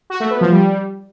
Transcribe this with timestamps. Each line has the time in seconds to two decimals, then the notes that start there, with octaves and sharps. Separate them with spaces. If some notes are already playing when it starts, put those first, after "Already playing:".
0.10 F#4
0.20 A3
0.31 B3
0.41 F3
0.51 G3